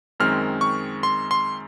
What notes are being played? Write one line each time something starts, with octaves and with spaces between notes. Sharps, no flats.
F#2 D#3 G#3 C4 F6
C#6
C6
C6